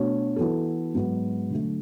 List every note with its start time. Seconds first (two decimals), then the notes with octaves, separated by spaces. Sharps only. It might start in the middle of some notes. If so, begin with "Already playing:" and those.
Already playing: B2 A3 D4 F#4 C#5
0.36 E3 B3 F#4 A4
0.94 G#2 F#3 B3 F#4
1.50 D3 F#3 A3